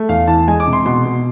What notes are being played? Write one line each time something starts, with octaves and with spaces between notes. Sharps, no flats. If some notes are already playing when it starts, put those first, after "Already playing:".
Already playing: A3
E2 F5
E3 A5
G#3 G#5
D6
C3
C6
B2 C6
B2